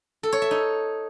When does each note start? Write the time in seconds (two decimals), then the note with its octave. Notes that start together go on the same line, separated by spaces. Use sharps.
0.23 A4
0.33 C#5
0.42 E5
0.51 D#4